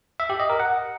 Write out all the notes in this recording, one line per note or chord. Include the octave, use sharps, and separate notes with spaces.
E5
G4
D#5
A#4
F#5